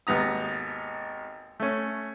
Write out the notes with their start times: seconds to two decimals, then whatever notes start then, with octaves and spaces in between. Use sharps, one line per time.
0.07 G#1 D#2 B3 A#5 D#6
1.60 A3 C#4